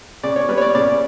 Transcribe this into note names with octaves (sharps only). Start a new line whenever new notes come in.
C#3 D5
C#5
G3 B4
C#5
D5
C#3 D5